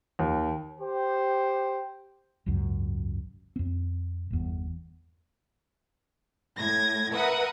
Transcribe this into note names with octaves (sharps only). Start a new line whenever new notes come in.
D#2
G4 C5
G#1 C#2 F#2
F2 C4
G1 E2
A2 G#6 A#6
A#4 B4 E5 F#5 D#6